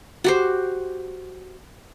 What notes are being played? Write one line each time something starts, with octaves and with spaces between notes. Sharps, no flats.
F#4 G4 C5